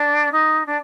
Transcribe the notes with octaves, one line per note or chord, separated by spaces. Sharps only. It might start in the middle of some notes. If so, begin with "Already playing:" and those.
Already playing: D4
D#4
D4